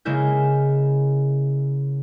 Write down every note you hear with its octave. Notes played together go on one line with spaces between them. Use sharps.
C#3 G#3 A#3 E4 G6